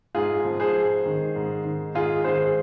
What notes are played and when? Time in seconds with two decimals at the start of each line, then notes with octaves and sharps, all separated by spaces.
0.15 G#2 F4 G#4
0.45 F3
0.60 G#4 C5
0.75 G#2
1.05 D#3
1.36 G#2
1.65 D#3
1.95 G#2 F4 G#4
2.24 D#3 G#4 C5